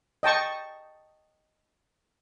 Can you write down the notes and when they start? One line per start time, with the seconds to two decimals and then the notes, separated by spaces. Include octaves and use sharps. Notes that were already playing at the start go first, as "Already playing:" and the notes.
0.23 D#5 G5 A5 C#6